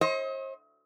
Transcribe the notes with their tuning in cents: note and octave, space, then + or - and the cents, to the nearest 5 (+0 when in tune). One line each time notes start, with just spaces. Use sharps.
C5 +45 D#5 +40